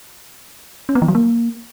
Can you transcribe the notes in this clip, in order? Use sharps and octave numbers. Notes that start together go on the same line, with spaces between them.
C#4
B3
E3
F#3
A#3